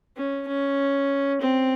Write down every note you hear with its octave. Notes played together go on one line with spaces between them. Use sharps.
C#4
C#4
C4